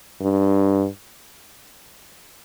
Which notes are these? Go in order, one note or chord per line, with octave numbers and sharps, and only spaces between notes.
G2